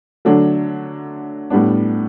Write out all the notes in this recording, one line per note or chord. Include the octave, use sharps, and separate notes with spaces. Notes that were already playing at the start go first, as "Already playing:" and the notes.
D3 F#3 A3 D4
A2 G3 B3 D4